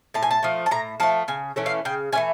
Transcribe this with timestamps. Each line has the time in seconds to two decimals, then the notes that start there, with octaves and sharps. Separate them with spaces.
0.14 A2 A5
0.23 G#5
0.31 A5
0.43 F3 A3
0.66 A5
0.71 A2 A#5
1.00 F3 A3 A5
1.28 C#3 G#5
1.56 E3 A3 C#4
1.66 F5
1.85 C#3 G5
2.12 E3 A3 C#4 G#5